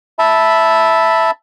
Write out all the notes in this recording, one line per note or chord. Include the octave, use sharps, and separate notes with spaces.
E5 A5 B5